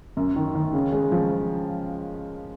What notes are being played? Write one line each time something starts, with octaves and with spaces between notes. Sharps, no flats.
F#2
D#3
D#3
C#3
G#3
F3